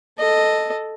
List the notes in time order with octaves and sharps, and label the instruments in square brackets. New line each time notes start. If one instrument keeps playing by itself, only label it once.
[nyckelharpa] A4 D#5